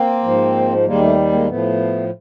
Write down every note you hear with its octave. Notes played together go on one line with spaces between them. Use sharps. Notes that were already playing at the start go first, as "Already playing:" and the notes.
Already playing: A#3 C4
G#2 F3
D#2 D#3 G3 G#3 A#3
A3
G#3 A#3
A2 F3 A3 B3